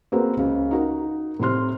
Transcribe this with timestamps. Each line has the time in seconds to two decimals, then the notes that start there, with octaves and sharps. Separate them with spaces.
0.12 A#3 C4 F#4 G#4 B4
0.37 C#2 C#3
0.71 D#4 F#4 A#4
1.39 A2 C3 C5 C6 F6